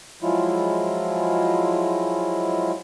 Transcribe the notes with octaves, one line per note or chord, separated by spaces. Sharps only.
F3 F#3 G#3 E4 F4